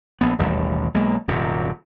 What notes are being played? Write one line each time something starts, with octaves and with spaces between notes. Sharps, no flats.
A#1 B3
E1 A1 D#2 G3
B1 G#3 A#3
D#1 F#2 C3